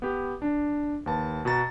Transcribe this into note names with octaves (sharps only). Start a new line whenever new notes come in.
B3 G4
D4
D#2 B4 A5
B2 F#4 A#5 A6